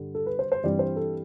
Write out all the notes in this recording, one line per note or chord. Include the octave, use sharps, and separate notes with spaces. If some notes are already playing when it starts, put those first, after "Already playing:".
Already playing: G2 D3 G3
A4
B4
C5
C5
G2 E3 G3 C4 D5
C5
A4